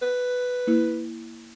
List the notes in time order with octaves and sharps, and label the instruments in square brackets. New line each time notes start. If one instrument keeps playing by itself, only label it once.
[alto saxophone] B4
[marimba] A#3 E4